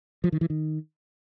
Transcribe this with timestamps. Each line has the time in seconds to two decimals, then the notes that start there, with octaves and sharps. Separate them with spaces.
0.24 F3
0.32 D#3
0.41 E3
0.50 D#3